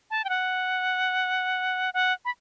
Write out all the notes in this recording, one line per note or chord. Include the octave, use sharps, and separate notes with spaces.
A5
G5
F#5
F#5
B5